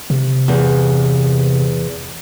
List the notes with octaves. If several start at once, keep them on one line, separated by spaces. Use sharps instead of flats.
C3
E2